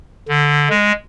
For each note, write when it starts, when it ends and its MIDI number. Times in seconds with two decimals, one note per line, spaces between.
0.28 0.68 50
0.70 0.92 56